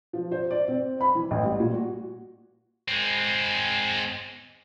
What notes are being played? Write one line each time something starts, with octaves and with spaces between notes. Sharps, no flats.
F3
C5
D5
C4
B5
E3
A1
G3
A#2
F#4
G#3 C4